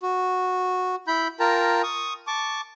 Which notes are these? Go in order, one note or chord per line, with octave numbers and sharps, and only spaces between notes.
F#4
E4 B5 G6
F4 A#4 G5 A5 A#5
C#6 D#6
A5 C#6 D6